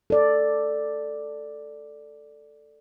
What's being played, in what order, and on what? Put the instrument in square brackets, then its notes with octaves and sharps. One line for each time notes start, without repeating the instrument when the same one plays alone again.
[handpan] A4 D5